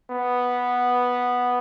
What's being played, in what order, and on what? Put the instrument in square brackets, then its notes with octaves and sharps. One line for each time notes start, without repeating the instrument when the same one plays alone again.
[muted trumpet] B3